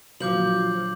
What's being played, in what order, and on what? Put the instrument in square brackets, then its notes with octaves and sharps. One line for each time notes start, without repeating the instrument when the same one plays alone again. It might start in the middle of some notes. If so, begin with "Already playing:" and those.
[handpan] A#2 D3 F#3 [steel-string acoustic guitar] F3 [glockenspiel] D6 G6 F#7